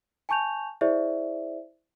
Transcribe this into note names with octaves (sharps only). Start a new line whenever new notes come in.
G#5 A5 C#6 G6 F7
E4 G#4 C5 D5 E5